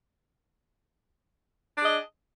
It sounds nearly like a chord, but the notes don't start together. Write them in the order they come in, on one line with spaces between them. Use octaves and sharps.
D4 G#4 D#5